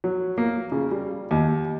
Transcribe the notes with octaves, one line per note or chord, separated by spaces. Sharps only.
F#3
A#3
C#3
G3
D#2